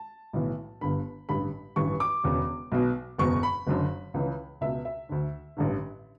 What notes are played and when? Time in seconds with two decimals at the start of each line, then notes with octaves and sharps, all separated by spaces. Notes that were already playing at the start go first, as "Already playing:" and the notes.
Already playing: A5
0.33 B1 A2 E3
0.81 G1 G2 D3 B5
1.29 A1 G2 D3 B5
1.76 A1 G2 E3 C#6
2.00 D6
2.24 E1 E2 C#3
2.72 B1 B2
3.18 F#1 E2 B2 C#6
3.43 B5
3.67 F#1 F#2 D3
4.14 C#2 C#3 E3
4.61 C#2 B2 E5
4.85 E5
5.09 D2 D3
5.57 A1 G2 D3